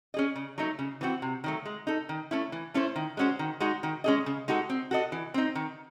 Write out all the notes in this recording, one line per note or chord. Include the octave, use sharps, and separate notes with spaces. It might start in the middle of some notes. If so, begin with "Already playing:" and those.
C#4 G#4 D#5
C#3
F#3 A3 D#4
C#3
E3 C4 F#4
C3
D#3 F#3 A3
G#3
D#4 A4
D#3
A3 C#4 E4
E3
A3 C#4 E4 C5
D#3
G#3 C#4 F#4 C5
D#3
G#3 D#4 F#4
D#3
G#3 C#4 G#4 D#5
C#3
G#3 D#4 F#4 A4
C4
F#4 A4 D#5
E3
C4 D#4
D#3